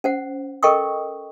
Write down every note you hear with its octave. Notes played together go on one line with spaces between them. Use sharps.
C#4 C5 F#5
A4 A#4 D#5 G5 C#6 D#6